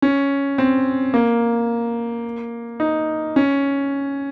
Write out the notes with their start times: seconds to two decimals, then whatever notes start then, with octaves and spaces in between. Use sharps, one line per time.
0.02 C#4
0.58 C4
1.14 A#3
2.80 D#4
3.36 C#4